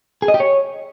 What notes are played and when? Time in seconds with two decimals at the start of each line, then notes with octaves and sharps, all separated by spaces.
0.22 G#4
0.28 D#5
0.34 G4
0.40 C#5